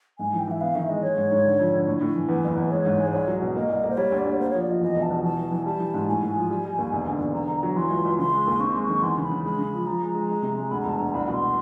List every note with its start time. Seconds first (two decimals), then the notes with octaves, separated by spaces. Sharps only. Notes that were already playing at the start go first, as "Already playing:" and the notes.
0.19 G#2 G#5
0.33 E3
0.39 G5
0.47 E3 E5
0.61 B3 F5
0.75 D#3 E5
0.89 G#3 D#5
1.02 G#3 C#5
1.17 G#2
1.31 G#2
1.45 D3
1.59 F2
1.73 D3
1.87 A2
2.01 A2
2.15 E3
2.29 E2 B4
2.44 F#1
2.57 E2
2.71 G#3 C#5
2.86 G#2
3.00 G#3
3.07 C5
3.13 C2 C#5
3.27 F#3
3.41 B2
3.55 A#3 D#5
3.69 C2
3.84 A#3
3.90 C5
3.97 G3 C#5
4.12 D2
4.18 D5
4.25 D2
4.32 C#5
4.39 A#3 C5
4.50 F3 C#5
4.61 D5
4.67 F3 D#5
4.81 E2 D#5
4.96 E1
5.02 A5
5.10 B2
5.23 E3 A5
5.38 E3
5.51 E3
5.66 G3 A5
5.79 E3
5.94 G#2
6.08 A2 G#5
6.22 A2
6.36 F3
6.50 G3
6.65 G3
6.78 D#2
6.92 E1
7.07 D3
7.20 E1
7.34 D3 A#5
7.48 D3
7.56 A#5
7.63 F#3
7.76 E3 C6
7.90 C#2
8.05 C#2
8.19 C#3 C6
8.32 G#3
8.47 D#2
8.60 C4 C#6
8.72 G#3 C6
8.83 C#6
8.89 D#3
9.02 E2 C6
9.17 C#3 C6
9.23 B5
9.31 C#3
9.45 G#3 B5
9.58 C#3
9.73 F3
9.87 F3 A#5
10.00 G#3
10.15 G#3
10.29 G#3
10.42 C3
10.57 G#3
10.71 D2 B5
10.80 A#5
10.85 E1 A5
10.99 D2 A#5
11.13 C2 B5
11.26 B2 B5
11.34 C6